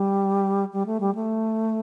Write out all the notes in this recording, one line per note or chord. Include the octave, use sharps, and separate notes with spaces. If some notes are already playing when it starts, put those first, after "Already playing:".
Already playing: G3
G3
A3
G3
A3